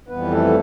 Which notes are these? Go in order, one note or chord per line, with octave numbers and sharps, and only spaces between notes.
F2 E3 G3 B3 B4
A3 A4